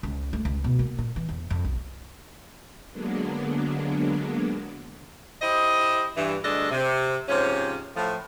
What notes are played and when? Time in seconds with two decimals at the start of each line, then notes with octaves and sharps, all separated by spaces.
0.03 C#2
0.33 A3
0.45 C#2
0.64 B2
0.79 A#3
0.99 A#2
1.16 E3
1.29 E2
1.50 F2
1.64 B1
2.92 D3 F#3 G#3 A#3 B3 D4
5.41 E4 G4 C5 D#5
6.16 G2 E3
6.44 D2 G2 G#3 D4 A4 D#5
6.71 C3
7.28 G#2 C3 F3 C#4
7.96 A2 F3